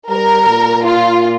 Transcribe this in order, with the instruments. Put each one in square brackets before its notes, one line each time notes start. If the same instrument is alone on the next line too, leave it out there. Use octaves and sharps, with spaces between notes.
[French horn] G3 [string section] A#4
[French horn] A#2
[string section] F4